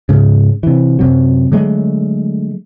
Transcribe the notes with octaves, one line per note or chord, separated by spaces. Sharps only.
G#2 C#3
C3 E3
F#2 C3 F#3
D3 F#3 G#3 A3